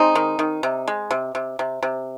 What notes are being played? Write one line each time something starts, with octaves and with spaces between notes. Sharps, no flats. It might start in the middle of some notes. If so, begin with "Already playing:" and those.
Already playing: G#3 C4 D#4
D#3
D#3
C3
G#3
C3
C3
C3
C3